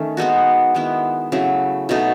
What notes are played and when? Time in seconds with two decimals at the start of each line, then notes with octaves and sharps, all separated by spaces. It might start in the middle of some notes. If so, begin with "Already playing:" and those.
Already playing: D#3 A3 C#4
0.17 G#3 B3 D#4 F#4
0.75 D#3 G#3 B3 E4
1.32 C#3 F#3 A3 E4
1.89 B2 A3 D#4 A4